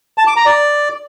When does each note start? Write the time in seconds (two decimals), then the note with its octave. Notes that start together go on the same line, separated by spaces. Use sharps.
0.18 A5
0.27 D6
0.36 A#5
0.46 D5